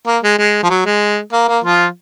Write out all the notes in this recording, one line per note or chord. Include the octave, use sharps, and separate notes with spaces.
A#3
G#3
G#3
F3
F#3
G#3
A#3
A#3
F3 F4